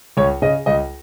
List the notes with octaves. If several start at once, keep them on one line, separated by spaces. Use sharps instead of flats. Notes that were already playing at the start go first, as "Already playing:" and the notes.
C#2 C#5
C#3 D#5
C#2 D#5